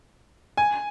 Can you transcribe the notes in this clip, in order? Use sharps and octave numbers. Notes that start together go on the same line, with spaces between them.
G#5